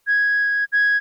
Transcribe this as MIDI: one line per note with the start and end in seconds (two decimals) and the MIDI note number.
0.07 0.64 92
0.72 0.97 92